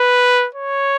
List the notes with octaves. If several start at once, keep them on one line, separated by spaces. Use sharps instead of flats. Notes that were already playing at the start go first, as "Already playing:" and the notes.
Already playing: B4
C#5